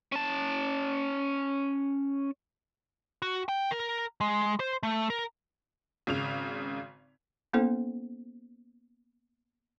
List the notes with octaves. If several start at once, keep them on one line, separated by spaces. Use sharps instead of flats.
C#4 A5
F#4
G5
A#4
G#3
C5
A3
A#4
G#1 C#3 F7
A#3 B3 C#4 E4 A4 C5